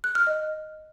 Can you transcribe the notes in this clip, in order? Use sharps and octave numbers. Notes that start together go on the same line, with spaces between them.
F#6
F6
D#5